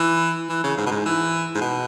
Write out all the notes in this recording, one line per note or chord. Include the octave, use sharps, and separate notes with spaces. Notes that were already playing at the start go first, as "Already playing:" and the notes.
Already playing: E3
E3
C#3
G#2
B2
G#2
E3
G#2
B2